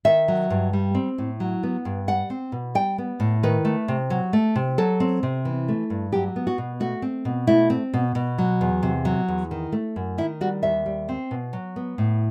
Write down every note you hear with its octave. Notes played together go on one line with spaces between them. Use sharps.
D#3 E5
F#3
G2
G3
C4
A2
F#3
B3
G2
G3 F#5
C4
B2
G3 G5
B3
A2
D#3 B4
A3
C3
F#3
A3
C3
F#3 A4
C4
C3
E3
A3
G2
F#3 G4
B3
F#4
B2
A3 F#4
C4
B2
A3 E4
C4
B2
B2
F#3
E2
C3
F#3
E2
D#3
A3
F#2
D#3 E4
G3 F#4
D#2 E5
G3
C4
B2
F#3
B3
A2